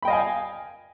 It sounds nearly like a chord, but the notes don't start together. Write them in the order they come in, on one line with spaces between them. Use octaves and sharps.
B5 G5 D#5 F5 G#5